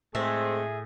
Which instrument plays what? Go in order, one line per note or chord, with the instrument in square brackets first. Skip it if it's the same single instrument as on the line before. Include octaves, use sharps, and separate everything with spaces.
[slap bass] A2 [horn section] G#3 A3 C4 [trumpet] G#4 [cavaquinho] E5